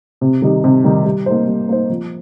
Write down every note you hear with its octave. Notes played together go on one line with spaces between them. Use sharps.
C3
D#3 G3 D#4 G4
C3
D#3 G3 D#4 G4
G3
A#3 D#4 C5
G3
A#3 D#4 C5
F3